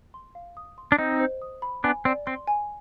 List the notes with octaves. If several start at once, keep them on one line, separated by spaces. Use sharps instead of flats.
C6
F5
D#6
C6
D4
C4 D#4 D#5
C5
D#6
B5
B3 D4 G#5
C4 D5
C4 C6
G#5